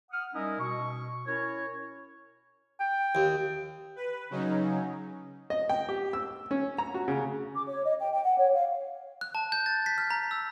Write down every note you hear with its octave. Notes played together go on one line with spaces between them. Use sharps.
F#5 D#6 F6
G3 C#4 D#4 E4 A#4 D#5
B2 C#6
C#4 E4 A#4 C#5
G5
D#2
B4
C#3 F#3 C#4 D#4
D#5
G5
G4
E6
C#4
A#5
F#4
C#3
D6
C#5
D#5
G5
G5
F#5
C#5
F5
F#6
A5
G6
A6
B6
F6
A#5
E6